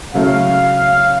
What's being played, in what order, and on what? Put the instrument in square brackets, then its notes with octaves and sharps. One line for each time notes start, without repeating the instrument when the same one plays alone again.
[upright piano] C#3 F#3 A3 [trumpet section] F5